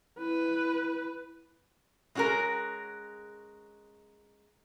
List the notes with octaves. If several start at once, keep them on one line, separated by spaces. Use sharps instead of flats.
E4 B4
G#3 C#4 F#4 G#4 A#4